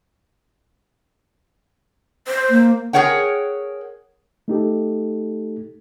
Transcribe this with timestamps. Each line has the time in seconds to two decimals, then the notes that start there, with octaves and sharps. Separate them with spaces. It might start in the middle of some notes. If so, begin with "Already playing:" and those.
2.28 C5
2.50 A#3
2.93 G#4 A#4 C#5 F#5 G5
4.48 A3 D#4 G4 A4